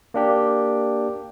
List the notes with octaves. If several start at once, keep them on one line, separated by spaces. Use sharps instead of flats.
A#3 D4 G4